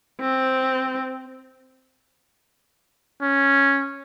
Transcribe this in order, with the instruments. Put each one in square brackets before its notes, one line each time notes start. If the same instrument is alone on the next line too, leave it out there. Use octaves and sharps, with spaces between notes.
[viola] C4
[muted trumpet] C#4